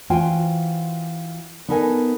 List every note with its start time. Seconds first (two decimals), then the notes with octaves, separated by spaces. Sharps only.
0.10 E3 F4 F#4 C5 G5 G#5
1.69 B3 D#4 A4 A#4 D#5 G#5